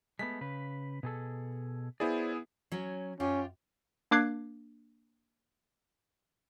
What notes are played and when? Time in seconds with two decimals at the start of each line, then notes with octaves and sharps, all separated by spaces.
0.19 G#3 A3 B3 B6
0.41 C#3 B4
1.03 B2 G#4 A4
2.00 B3 E4 G#4 C5 D5
2.72 F#3 C#4
3.20 F#2 C#4 F4 G4
4.11 A#3 D4 D6 F#6 G#6 C7